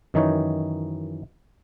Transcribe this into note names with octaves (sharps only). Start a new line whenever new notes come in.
F#2 D#3 E3 D#4 C#5